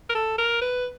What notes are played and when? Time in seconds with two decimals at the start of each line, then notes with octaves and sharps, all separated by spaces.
0.10 A#4
0.15 A4
0.38 A#4
0.62 B4